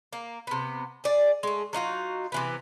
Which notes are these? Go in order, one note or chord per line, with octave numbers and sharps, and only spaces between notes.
A#3
C3 B3
G#4 D5
G#3 A3
F#3 D#4 F4 F#4
C3 E3 B3